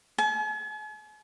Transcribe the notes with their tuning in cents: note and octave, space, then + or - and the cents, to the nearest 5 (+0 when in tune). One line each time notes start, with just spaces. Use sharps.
G#5 +45